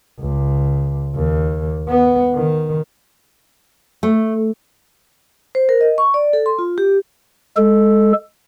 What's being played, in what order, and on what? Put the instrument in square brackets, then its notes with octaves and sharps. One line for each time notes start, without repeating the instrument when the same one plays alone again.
[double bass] C#2
D#2
B3
D#3
[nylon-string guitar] A3
[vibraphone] C5
A#4
D#5
C#6
D5
A4
C6
F4
G4
[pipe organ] G#3 A4